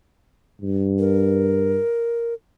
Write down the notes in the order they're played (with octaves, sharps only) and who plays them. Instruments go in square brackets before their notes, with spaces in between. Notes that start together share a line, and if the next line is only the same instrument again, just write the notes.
[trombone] G2
[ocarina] A#4